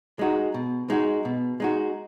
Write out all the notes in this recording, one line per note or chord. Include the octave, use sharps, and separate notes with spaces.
G#3 D#4 F#4
B2
G#3 D#4 F#4
B2
G#3 D#4 F#4